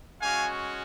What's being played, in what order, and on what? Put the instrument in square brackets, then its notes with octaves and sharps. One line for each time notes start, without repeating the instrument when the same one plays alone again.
[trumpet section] G#3 C#4 F#4 F5 G#5